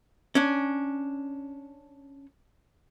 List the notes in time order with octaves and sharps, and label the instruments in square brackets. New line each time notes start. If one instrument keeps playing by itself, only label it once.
[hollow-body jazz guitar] C#4 D4